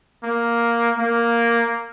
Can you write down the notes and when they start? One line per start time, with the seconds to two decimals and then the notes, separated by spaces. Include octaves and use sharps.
0.24 A#3
0.98 A#3